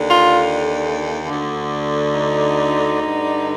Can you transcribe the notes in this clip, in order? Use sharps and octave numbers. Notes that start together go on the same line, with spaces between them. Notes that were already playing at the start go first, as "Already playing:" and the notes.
Already playing: D#2 D3
F4
D2 D3
D#4
G2 D3